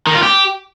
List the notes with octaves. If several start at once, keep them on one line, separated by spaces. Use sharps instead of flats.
D#3
F4
G4